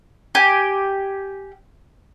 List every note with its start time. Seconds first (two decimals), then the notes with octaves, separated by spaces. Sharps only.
0.35 G4 G#5